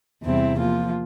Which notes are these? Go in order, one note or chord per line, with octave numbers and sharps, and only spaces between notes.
E2 C3 G3 C4 E4
F3 A#3 F4